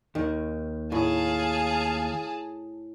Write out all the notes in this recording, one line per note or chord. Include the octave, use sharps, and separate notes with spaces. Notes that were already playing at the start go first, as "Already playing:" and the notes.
D#2 D#3
A2 G#4 F5 A5